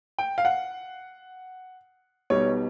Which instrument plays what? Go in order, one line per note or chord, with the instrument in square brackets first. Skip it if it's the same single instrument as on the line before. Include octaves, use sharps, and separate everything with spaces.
[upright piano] G5
F5
F#5
B1 B2 G3 C#5